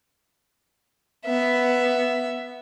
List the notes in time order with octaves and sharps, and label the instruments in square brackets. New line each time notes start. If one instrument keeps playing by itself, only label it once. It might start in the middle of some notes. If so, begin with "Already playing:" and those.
[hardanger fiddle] B3 E5